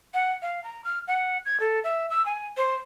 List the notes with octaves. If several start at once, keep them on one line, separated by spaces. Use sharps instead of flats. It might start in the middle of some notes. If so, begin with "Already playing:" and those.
F#5
F5
A#5
F6
F#5
G#6
A4
E5
E6
G#5
C5